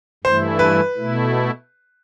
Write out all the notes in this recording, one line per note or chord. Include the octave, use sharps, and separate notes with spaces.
G2 E3 A3 E4 C5
B4
B2 A3 E4